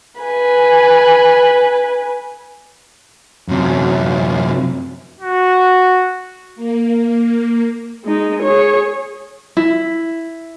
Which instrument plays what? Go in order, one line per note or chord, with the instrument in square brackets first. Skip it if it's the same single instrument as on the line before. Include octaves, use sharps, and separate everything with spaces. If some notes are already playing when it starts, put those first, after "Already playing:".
[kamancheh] B4 G#5
[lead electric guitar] F#2 C3
[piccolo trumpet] F#4
[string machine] A#3
[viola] G#3 D#4
G#4 C#5
[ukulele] E4